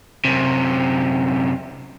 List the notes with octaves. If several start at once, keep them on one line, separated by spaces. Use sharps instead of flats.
F#2 C3